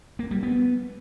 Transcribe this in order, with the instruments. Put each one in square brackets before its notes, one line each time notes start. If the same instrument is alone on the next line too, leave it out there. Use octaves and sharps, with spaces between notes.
[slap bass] A#3
G3
B3